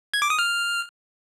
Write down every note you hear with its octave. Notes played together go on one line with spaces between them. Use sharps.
G#6
D6
D#6
F6